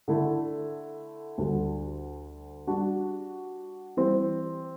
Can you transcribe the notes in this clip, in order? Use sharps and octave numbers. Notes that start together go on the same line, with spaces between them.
D3 A3 E4 A4
D2 D3 G3
G3 D4 F#4
E3 G3 C4